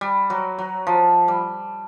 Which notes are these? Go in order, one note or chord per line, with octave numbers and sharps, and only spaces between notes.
G3
F#3
F#3
F3
G3